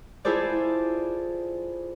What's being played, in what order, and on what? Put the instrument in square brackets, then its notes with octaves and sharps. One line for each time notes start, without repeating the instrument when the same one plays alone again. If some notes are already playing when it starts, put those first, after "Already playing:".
[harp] E4 F4 G#4 A4 C5 D5